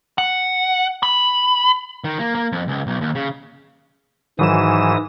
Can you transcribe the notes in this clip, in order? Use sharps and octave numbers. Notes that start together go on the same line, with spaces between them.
F#5
B5
D#3
A#3
A#3
F2
C#2
B1
D#2
C#3
G#2 D#3 E3 F#3 D#6 E7